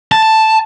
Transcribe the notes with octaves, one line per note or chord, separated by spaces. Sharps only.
A5